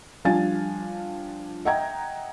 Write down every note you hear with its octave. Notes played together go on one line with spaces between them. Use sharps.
F3 G3 D4 F5 G#5 A6
D#5 E5 F#5 G5 A#5 G#6